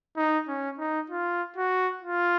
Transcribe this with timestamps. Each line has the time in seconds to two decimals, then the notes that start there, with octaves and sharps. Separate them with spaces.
0.17 D#4
0.48 C#4
0.78 D#4
1.10 F4
1.56 F#4
2.03 F4